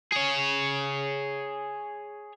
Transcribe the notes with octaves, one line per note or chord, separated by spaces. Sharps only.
G#4 C#5